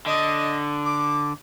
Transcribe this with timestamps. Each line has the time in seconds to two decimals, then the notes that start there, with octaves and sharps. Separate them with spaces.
0.06 D3 D#5
0.84 D6